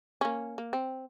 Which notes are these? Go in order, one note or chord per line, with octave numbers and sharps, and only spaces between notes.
A#3 C#4
A#3
C4